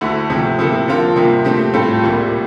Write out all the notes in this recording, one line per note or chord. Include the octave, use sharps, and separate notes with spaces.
D2 D3 A3 E4
C3 F3 A3
C3 F3 A#3 E4 A4
D3 F3 C4 F4 A#4
C3 G3 A#3
A#2 A3 C4 G4
A2 G3 C4 F4 A4
C2 A#2 G3 A#3 F4